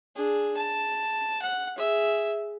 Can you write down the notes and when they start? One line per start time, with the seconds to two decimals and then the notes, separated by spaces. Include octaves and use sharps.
0.16 D4 G#4
0.57 A5
1.43 F#5
1.77 G#4 E5